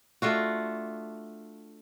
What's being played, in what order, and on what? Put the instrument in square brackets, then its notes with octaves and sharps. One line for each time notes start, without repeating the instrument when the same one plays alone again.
[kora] A3 D4 F4 F#4